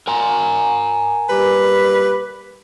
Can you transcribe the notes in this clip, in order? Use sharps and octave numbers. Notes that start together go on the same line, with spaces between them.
A#4 G#5 A#5
A#2 G3 G4 B4